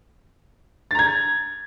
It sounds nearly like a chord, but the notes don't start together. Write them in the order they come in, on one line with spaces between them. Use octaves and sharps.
A6 A#5 G#6